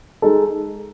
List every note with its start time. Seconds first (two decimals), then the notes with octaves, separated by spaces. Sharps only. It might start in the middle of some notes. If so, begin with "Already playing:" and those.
0.22 G#3 D#4 A4